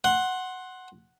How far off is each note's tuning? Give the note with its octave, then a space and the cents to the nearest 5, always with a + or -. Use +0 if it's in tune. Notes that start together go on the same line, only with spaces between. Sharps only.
F#5 +0 C6 +15